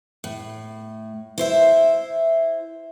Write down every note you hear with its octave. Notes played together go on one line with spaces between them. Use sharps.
A2
E4 C5 E5